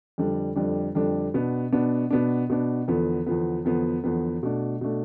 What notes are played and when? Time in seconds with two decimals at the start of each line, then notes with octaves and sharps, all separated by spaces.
0.18 F2 D3 G3 D4
0.56 F2 D3 G3 D4
0.95 F2 D3 G3 D4
1.34 B2 B3 D4
1.72 B2 B3 D4
2.11 B2 B3 D4
2.50 B2 B3 D4
2.88 E2 D3 F3 B3
3.26 E2 D3 F3 B3
3.65 E2 D3 F3 B3
4.04 E2 D3 F3 B3
4.43 B2 A3 D4
4.81 B2 A3 D4